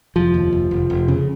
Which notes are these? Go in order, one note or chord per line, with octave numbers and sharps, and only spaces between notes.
F1 F3
D#2
F1
F1
F1
C#3